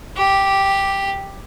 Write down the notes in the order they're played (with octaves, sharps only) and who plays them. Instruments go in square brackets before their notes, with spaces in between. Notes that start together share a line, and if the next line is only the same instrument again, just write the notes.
[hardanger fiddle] G4